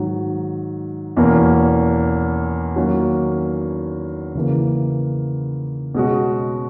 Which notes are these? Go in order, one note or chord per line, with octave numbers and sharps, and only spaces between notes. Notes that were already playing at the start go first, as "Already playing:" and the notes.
Already playing: G#2 D#3 F#3
E2 B2 A#3 C#4
D#3 F#3 A#3 C#4 F#4
C#3 E3 A#3
B2 G#3 C#4 F#4